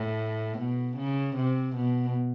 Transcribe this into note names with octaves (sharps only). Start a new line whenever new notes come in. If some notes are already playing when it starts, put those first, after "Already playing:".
Already playing: A2
B2
C#3
C3
B2